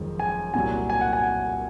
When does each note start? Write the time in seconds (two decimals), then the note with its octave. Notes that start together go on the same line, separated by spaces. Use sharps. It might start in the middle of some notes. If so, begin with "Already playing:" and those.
Already playing: F#1 F2 D#3 G#3
0.19 G#5
0.54 C2 A#2 F#3 G#5
0.90 G#5
1.01 F#5
1.13 G#5